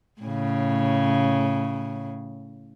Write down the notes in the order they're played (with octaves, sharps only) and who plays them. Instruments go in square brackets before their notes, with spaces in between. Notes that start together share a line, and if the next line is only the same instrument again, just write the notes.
[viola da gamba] A2 C#3